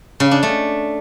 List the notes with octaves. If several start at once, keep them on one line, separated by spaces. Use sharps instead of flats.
C#3
D4
A3